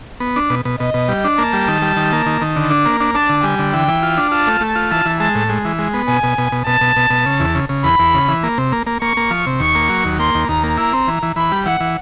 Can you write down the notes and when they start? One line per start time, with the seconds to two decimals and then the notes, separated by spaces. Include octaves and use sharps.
0.20 B3
0.36 D4
0.50 B2
0.65 B2
0.80 B2 D#5
0.94 B2
1.08 G3
1.24 D4
1.38 A#3 A5
1.53 G3
1.68 D#3
1.82 G3
1.97 D#3
2.12 A#3
2.26 D#3
2.41 D#3
2.56 D3
2.70 D4
2.86 A#3
3.01 D4
3.15 D4 A5
3.29 D3
3.43 G3 G#5
3.59 D3
3.73 E3 G5
3.88 E3
4.03 F4
4.17 D4
4.31 F4 A5
4.47 A3
4.61 A3
4.75 F4
4.91 E3 A5
5.06 E3
5.20 G#3 A5
5.35 A2
5.49 G#3
5.65 E3
5.79 G#3
5.94 B3
6.08 B2 G#5
6.23 B2
6.38 B2
6.52 B2
6.66 B2 A5
6.81 B2
6.96 B2
7.10 B2
7.26 C#3
7.40 E2
7.55 C#3
7.69 C#3
7.84 E2 B5
7.99 E2
8.14 C#3
8.28 E3
8.43 A#3
8.58 C3
8.72 A#3
8.87 A#3
9.02 A#3 C#6
9.17 A#3
9.31 F3
9.47 C3
9.60 D#2 C#6
9.75 A#3
9.89 F#3
10.05 D#2
10.19 A#3 C6
10.35 D#2
10.49 D#2 A#5
10.64 A#3
10.78 E4 A#5
10.93 C4
11.08 E3
11.23 E3
11.36 E3 B5
11.52 G3
11.66 E3 F#5
11.81 E3